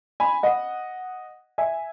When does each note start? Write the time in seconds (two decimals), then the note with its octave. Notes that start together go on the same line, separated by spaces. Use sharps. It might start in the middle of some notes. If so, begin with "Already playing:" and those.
0.20 G#5 B5
0.43 D#5 F#5
1.58 E5 G#5